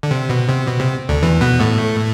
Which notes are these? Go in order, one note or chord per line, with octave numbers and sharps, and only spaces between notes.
D3
C3
B2
C3
B2
C3
D2 D3
E2 E3
B2 B3
A2 A3